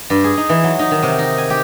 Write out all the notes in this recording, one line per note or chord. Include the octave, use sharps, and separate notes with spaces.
G2
G#4
D#4
E3
F#3
D#4
D#3
C3
D#4
G#5
G4